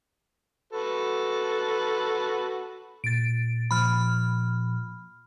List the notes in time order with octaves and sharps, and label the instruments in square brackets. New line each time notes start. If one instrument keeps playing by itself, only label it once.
[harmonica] F#4 A4 B4
[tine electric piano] A#2 [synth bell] A6 D7
[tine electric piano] A#2 F3 [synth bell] B5 F6